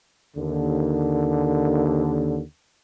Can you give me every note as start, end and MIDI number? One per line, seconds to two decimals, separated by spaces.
0.36 2.40 39
0.36 2.40 50